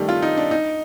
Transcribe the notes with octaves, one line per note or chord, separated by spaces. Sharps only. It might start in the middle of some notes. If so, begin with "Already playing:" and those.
Already playing: D#3 G3 A3
F4
D#4
D4
D#4